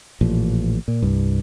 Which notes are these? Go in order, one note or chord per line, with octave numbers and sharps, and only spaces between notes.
A1 A#2 F3
A#2
C2 G2